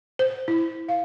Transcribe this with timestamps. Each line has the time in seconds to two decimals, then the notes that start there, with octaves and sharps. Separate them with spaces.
0.19 C5
0.48 E4
0.89 F5